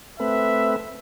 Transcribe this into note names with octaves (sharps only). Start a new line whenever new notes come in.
A3 C4 B4 E5